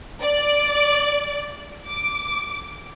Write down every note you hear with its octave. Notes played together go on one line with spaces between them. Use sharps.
D5
D6